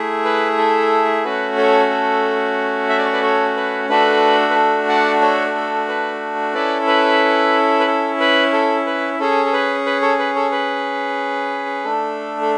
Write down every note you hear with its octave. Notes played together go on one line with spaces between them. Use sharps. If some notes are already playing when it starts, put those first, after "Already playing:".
Already playing: A3 E4 G#4
B4
A4
A3 C#4 F#4 B4
A4 C#5
A4
E5
D5
C#5
B4 D5
A4 C#5
B4
A3 D4 F#4 A4 B4
B4
A4
D5 F#5
A4 C#5
A4
B4
C#4 E4 A4 B4 D5
B4
B4
A4
B4
A4
B4
C#4 G#4 A4
A4
B4
B4
A4 C#5
B4
A4 C#5
B4
A3 D4 A4
A4